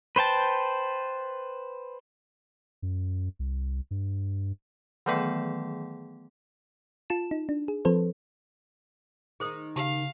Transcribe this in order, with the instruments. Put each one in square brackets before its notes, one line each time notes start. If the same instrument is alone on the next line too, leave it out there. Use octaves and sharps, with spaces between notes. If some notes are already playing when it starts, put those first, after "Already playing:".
[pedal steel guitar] B4 C5 G5 A5
[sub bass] F#2
C2
G2
[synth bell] D#3 E3 F#3 A3 B3 G#4
[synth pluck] F4 A5 E7
D#4
D4
G#4
F3 C4 A4 B4 C5
[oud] D#3 D#4 [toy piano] G#4 C5 D#6
[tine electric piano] C#3 [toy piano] G4 A5 [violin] F5